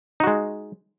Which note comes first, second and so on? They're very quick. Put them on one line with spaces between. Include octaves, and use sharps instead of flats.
D#4 F#4 G#3